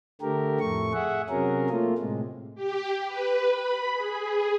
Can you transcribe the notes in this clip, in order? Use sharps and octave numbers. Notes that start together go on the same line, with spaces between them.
D3 A3 G4 A#4
F2 A2 A3 C#6
G#4 E5 F#5
C3 F#3 C#4 G#4 A#4
A3 A#3 F4
A2 C3 G#3
G4
B4
B5
G#4